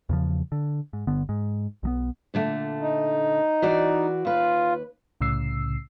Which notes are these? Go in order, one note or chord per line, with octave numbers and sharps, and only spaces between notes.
E2 C#3 F3
D3
G#2
G1 D3 B3
G#2
B1 F#3 B3
A#2 D3 A3
D#4
E3 F#4 D5
D#2 F4 B4
C2 A2 C#3 E6 C7